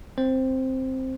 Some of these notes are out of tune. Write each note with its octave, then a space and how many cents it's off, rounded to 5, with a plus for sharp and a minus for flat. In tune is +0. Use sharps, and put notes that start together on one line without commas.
C4 +0 C5 +0